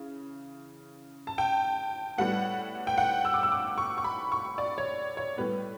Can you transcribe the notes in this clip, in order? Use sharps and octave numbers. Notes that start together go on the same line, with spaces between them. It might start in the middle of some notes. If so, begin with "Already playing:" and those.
Already playing: C#3 E3
A5
G5
A2 G3 B3 F#5
G5
F#5
E6
D6
E6
D6
C#6
C#6
B5
C#6
D5
C#5
C#5
A2 G3 B3 B4